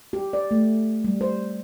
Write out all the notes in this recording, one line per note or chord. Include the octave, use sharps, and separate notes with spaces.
G4
D5
A3
G3
C5